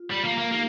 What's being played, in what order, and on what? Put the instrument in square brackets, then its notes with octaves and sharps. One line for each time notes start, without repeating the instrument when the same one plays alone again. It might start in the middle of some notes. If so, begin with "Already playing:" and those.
Already playing: [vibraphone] F4
[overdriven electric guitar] G3
A#3
A#3
[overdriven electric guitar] A#3 [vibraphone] D#4 G4